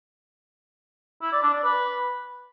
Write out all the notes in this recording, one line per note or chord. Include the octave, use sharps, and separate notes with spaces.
E4
D5
D4
D5
B4